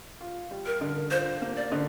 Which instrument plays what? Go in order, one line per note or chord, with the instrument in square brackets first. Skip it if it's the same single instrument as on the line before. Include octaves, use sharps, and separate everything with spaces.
[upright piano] F4
G3
[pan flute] A#4
[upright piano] D3
[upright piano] F4 [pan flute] C5
[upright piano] A#3
[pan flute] D5
[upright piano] D3